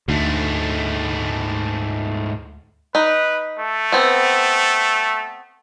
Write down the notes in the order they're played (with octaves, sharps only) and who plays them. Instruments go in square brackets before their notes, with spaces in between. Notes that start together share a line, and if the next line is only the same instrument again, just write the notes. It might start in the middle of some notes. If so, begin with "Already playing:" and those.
[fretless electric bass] D2 [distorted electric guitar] G#2 A3
[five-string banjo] D#4 [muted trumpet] B4
[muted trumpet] A3
[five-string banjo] B3 C4